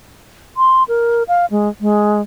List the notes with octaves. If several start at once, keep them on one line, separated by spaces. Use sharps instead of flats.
C6
A#4
F5
G#3
G#3